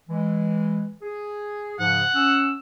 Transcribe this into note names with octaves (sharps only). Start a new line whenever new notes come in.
E3 G#3
G#4
G#2 C#3 F3 F#5
C#4 E6